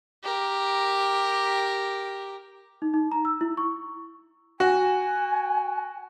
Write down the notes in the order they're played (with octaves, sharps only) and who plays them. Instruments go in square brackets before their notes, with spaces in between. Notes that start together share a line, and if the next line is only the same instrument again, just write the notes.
[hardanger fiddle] G4 A#4
[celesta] D#4
D#4
A#5
E6
E4
C#6
[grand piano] F#4 [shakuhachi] G#5